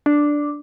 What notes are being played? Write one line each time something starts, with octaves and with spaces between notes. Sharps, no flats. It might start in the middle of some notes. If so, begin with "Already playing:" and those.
D4